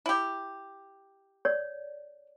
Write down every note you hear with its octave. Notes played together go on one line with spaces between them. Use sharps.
E4 G4
C#5 D5